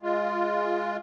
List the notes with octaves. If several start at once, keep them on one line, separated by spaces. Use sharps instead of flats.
G#3 F4